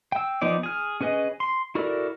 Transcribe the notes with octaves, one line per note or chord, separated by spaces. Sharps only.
G5 E6
F3 B3 D#4 D5
G#4 F6
C#4 G#4 B4 D#5
C6
E4 F#4 A4 A#4 D5